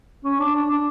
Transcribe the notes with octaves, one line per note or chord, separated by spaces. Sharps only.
C#4
D4
D4
D4